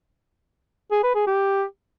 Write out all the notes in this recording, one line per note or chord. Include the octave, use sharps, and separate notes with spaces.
G#4
B4
G#4
G4